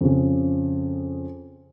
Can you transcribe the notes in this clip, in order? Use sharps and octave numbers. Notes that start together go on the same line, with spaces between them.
F2 C#3